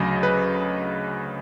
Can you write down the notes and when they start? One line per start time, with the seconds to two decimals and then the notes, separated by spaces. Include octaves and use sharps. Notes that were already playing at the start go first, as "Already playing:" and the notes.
Already playing: D2 C#3 F#3 D#5
0.23 B4